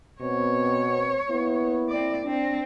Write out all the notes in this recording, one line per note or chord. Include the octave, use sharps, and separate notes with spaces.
B2 B3 C4 C#5
A#3 B3 E4
C4 D5
C4 D4